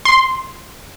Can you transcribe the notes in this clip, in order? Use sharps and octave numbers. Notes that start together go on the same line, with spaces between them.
C6